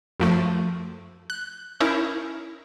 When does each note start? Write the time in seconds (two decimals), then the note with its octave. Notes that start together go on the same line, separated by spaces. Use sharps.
0.20 F#2 F3 A3
1.30 F#6
1.80 C#4 D#4 E4 A#4